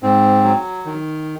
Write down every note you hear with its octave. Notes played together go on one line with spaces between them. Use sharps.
G#2 C4
F#3
D#3